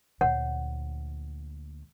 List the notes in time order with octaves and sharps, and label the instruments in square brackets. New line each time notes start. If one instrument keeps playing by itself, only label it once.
[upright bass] D2 A#2 [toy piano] C#5 F#5